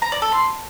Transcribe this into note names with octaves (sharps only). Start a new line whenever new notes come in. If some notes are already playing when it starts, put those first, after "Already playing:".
A#5
D5
A4
C6